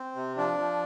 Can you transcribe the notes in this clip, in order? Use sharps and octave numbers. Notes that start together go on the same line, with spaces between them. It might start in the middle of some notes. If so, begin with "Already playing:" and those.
Already playing: C4
C3
F3 D4
F3